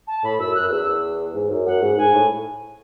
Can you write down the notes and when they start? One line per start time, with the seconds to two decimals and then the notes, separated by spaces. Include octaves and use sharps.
0.07 A5
0.23 A2 B5
0.39 F#2 E6
0.54 F#2 F#6
0.70 E2 E6
1.34 G#2
1.50 F#2
1.66 F#2 F#5
1.82 G#2
1.97 G#2 G#5
2.13 A2